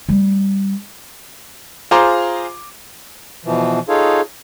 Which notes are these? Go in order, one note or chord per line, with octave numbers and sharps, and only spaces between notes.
G3 A3
F4 G#4 C5 A#5 C6 D6
B2 E3 F3
D#4 F4 G#4 A4 C#5 F5